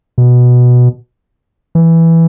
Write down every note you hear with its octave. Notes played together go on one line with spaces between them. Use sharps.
B2
E3